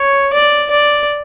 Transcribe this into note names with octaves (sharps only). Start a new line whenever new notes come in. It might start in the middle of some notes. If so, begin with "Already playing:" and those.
Already playing: C#5
D5
D5